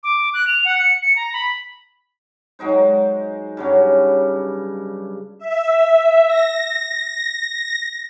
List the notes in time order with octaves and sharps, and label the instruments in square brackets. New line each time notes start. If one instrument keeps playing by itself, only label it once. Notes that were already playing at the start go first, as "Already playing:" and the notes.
[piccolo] D6
F#6
F7
F#5
C#7
C#7
A#5
B5
[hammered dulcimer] F#3 G#3 D#4 C5
G2 C#3 F#3
[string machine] E5
A#6